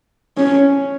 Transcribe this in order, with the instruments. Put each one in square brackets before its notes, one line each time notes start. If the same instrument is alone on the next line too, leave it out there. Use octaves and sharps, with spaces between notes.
[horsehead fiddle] C#4